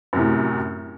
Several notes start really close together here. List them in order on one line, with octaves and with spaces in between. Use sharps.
F#2 C3 A2